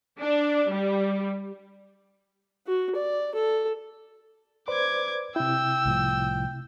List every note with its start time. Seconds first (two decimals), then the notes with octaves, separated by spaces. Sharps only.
0.18 D4
0.71 G3
2.67 F#4
2.96 D5
3.35 A4
4.68 B4 C5 D5 D6 G#6
5.36 C3 E4 G5 E6
5.85 C2 A2 F3